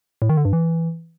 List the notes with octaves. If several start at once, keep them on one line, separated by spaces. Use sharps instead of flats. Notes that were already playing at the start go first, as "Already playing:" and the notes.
A2
D#3
D3
G2
E3